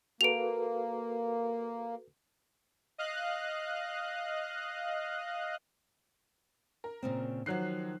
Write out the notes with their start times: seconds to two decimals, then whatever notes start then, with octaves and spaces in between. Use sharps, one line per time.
0.21 A#3 F#4 A4 B4 D7 F7
2.98 D#5 F5 F#6
6.84 A#4
7.03 A#2 C#3 C4
7.46 D#3 F3 F#3 F#6 C7